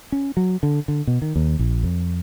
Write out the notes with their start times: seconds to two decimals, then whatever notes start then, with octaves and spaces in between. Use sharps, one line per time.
0.12 C#4
0.37 F#3
0.63 D3
0.88 D3
1.07 B2
1.22 D#3
1.36 D#2
1.59 A#1
1.83 F2